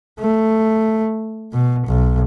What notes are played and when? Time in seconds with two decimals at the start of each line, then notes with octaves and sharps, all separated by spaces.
0.20 A3
1.53 B2
1.87 B1